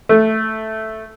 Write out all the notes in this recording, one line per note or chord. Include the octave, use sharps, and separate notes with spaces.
A3